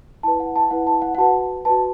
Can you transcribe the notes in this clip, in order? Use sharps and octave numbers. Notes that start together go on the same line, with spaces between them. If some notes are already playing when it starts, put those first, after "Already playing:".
E4 B4 A5
F#5
A5
E4 B4 F#5
A5
F#5
F#5
F#4 B4 A5
F#4 B4 A5